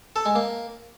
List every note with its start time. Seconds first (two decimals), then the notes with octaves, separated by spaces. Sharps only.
0.16 A4
0.26 G#3
0.35 A#3